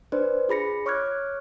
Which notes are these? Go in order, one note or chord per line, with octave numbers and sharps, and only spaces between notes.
D4 B4 C5 D5
F4 G#4 B5 A#6 C#7
C#5 C#6 D6 F6 F#6 G#6